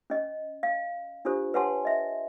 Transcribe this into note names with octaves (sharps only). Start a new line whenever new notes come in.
C#4 D#5
F5
D4 F4 G4 A4 C5
B4 C#5 F#5 G#5 A5 C6
D#5 E5